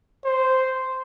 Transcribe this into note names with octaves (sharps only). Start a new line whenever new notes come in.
C5